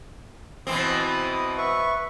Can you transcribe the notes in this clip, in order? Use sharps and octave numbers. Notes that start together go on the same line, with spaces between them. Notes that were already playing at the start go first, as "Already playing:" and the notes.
B2 E3 C4 D#6
B4 E5 C#6